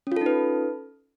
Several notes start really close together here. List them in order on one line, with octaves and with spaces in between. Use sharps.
C#4 F4 A4 D#4 B4